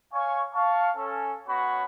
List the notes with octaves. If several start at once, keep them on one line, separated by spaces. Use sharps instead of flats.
C#5 F5 G#5 C#6
F5 A5 C#6
C#4 A4
B3 C#4 F#4 C#5 B5